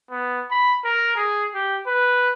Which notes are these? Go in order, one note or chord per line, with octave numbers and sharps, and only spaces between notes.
B3
B5
A#4
G#4
G4
B4